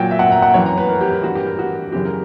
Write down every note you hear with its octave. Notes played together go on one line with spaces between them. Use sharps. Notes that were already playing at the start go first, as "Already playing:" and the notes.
Already playing: A#2 F#3 G5
E5
F#5
A#5
F#5
F#2 E3 C#5
A#5
B4
A#4
G4
A#4
G2 E3 F#4
G4
A#4
F#4
F#2 C#3 E3 G4
A#4